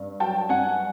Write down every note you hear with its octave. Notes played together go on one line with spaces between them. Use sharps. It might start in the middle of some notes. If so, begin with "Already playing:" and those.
Already playing: G2
F#3 G5 A5
G2 F#5 G#5